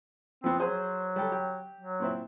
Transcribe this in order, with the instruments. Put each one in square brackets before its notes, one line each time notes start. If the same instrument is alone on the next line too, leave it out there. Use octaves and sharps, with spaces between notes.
[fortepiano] F3 B3 [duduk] C4
[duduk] F#3 [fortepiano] G#4 C5 G#5
[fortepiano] G3 G4 A4
G4
[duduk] F#3
[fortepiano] A#2 C4 E4